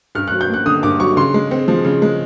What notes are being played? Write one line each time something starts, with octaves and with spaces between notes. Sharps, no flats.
G2 F6
F#6
F#3
G6
A#3 F#6
D3 D#6
G2 D6
F#3 C#6
C#3 C6
G#3
C4
F3
C#3
G#3